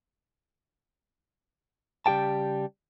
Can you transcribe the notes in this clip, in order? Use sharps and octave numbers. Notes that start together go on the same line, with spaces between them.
C#3 G3 G4 G5 A5